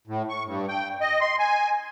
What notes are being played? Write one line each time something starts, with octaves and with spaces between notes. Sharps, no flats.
A2
C#6
G2
G5
D#5
C6
G#5